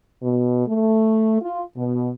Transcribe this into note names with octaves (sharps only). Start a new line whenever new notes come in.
B2
A3
F4
B2